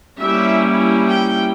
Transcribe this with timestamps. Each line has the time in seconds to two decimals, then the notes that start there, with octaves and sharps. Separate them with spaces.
0.20 G3 A#3 C#4 E4 E5
1.07 G5